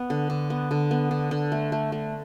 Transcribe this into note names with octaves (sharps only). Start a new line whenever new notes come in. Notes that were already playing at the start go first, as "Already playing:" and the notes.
Already playing: B3
D3
D3
B3
D3
B3
D3
D3
A3
A3
A3